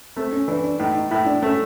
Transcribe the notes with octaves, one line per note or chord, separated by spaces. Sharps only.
A3 C4
C#4
E3 D4
D4
A2 D#4
D#4
A2 E4
D4
A3 C#4